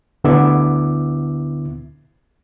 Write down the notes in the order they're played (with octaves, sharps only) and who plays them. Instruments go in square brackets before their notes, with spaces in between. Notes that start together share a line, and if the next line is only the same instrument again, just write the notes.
[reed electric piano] D2 D3 B3 E4 E5 D6